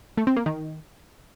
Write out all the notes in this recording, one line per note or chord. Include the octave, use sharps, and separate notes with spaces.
A3
C4
A#3
D#3